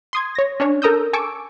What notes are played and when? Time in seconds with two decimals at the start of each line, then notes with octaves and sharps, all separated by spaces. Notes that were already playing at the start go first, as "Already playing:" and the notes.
0.13 C6 D#6 G#6
0.35 C#5 A#6
0.60 C#4 D4 C#5
0.82 A4 A#4 A#5 D#6 E6 G6
1.13 G#5 A5 C#6 D6 E6 D7